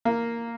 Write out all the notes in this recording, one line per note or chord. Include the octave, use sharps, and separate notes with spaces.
A#3